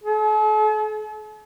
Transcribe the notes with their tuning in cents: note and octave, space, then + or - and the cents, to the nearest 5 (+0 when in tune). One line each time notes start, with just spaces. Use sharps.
A4 -45